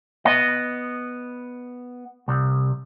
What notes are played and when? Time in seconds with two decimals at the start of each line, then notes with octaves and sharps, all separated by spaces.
0.25 B3 D#5
2.28 C2